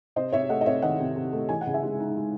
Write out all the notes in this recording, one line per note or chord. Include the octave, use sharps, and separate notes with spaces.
C3 C5 D#5
C3 C#5 E5
A3 D#5 F#5
D#5
C3 C#5 E5
D#3 D#5 F#5
C3
C3
A3
E3 G#5
F#5
C#3
E5 G#5
G#3
D#4
G#3